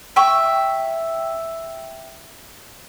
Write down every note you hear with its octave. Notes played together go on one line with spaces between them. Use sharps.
E5 G5 C#6